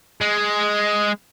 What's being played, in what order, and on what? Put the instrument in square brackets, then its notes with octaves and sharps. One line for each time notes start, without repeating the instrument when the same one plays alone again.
[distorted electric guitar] G#3